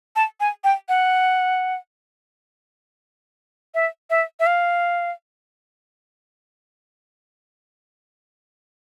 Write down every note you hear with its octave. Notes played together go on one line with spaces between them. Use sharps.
A5
G#5
G5
F#5
E5
E5
E5
F5